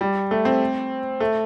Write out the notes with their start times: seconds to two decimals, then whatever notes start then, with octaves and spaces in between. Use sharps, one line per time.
0.01 G3
0.31 A3
0.45 C4
1.20 A3